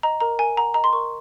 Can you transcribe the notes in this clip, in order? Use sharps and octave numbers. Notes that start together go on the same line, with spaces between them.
D#5 A#5
A#4 A#5
A#4 G#5
F#5 A#5
D#5 A#5
C6
A#4 C#6